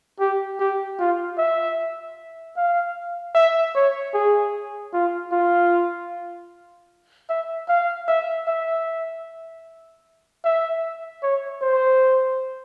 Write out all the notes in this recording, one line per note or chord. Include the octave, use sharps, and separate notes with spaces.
G4
G4
F4
E5
F5
E5
C#5
G#4
F4
F4
E5
F5
E5
E5
E5
C#5
C5